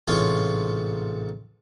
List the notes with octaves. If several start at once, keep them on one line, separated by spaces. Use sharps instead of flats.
A1 G#2 C3 F4 C#5